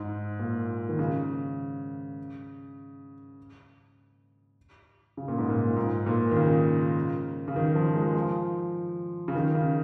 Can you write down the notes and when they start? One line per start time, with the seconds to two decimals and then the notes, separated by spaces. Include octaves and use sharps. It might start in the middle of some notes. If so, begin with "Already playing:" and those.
Already playing: G#2
0.39 A#2
0.89 D#3
0.99 C#3
5.17 C#3
5.28 A#2
5.38 G#2
5.50 A#2
5.77 G#2
6.06 A#2
6.31 D#3
6.36 C#3
7.48 C#3
7.56 D#3
7.75 F3
7.95 G#3
8.15 F3
9.28 C#3
9.35 D#3
9.55 C#3